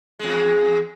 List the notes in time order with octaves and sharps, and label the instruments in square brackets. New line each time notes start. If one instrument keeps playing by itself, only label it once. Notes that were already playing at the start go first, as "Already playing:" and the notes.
[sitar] E2 G#3